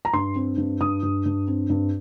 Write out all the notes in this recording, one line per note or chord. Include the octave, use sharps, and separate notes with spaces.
A#5
G2 C6
C4
G2
G2 D#6
G2
G2
C4
G2